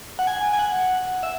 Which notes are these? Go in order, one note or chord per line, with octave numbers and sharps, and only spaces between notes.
F#5
G#5
G#5
F#5
E5